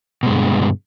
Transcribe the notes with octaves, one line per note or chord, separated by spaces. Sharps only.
G2 B2 D3 G#3